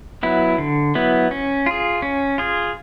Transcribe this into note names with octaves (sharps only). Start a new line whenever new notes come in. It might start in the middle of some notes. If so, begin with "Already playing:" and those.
F#3 B3 E4
D3
F#3 B3 E4
C#4
F4 G#4
C#4
F4 G#4